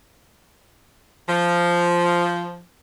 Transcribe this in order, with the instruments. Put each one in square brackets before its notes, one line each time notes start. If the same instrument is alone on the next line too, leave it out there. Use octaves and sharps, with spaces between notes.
[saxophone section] F3